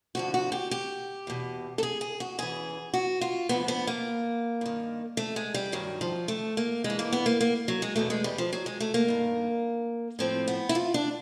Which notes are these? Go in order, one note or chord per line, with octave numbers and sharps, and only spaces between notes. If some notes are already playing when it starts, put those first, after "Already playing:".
G2 D3 F3 F#4
F#4
G4
G4
E2 B2
A4
G#4
G#4
F#4
E2 C#3 E3 G#4
F#4
F4
F2 D3 F3 B3
B3
A#3
G2 D#3
A3
G#3
G3
G2 D#3 F#3
F3
A3
A#3
G2 G#3
E3
A#3
B3
A#3
A#3
F#3
G#3
E2 B2 A3
G#3
G3
F3
F#3
G#3
A3
A#3
G2 D#3
A2 F3 C4
B3
E4
F4
D4